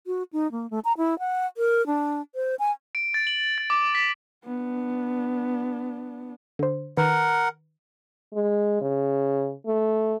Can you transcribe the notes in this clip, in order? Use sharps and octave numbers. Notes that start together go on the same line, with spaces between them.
F#4
D#4
A#3
A3
A#5
E4
F#5
A#4
D4
C5
G#5
D7
A6
F#7
A6
D6
B6
B3 D4
D3 C5
D#3 A#4 B4 F#5
G#3
C#3
A3